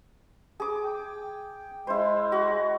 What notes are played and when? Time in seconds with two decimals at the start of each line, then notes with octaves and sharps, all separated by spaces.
0.60 G#4 D6
0.84 G5
1.87 G#3 E4 C5
2.32 F#4